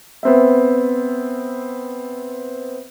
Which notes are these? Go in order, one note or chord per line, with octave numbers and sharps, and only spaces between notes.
B3 C4 E5